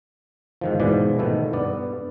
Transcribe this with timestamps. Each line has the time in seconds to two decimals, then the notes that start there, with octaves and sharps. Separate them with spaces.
0.61 G#2 D#3 F3
0.80 G#2 B2 E3 F3 D5
1.19 B2 D#3 A3 E4
1.53 G2 B3 D5